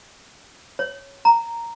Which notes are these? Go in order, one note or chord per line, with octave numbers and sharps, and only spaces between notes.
C#5
A#5